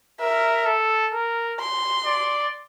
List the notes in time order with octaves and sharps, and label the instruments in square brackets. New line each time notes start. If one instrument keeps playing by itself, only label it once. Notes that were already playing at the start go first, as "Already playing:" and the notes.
[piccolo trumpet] A#4 [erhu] E5
[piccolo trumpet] A4
A#4
[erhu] C6
[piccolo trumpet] D5